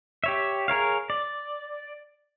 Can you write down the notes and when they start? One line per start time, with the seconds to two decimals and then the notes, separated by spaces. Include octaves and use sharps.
0.24 G4 C#5 E5
0.68 G#4 A#4 C#5 F5
1.10 D5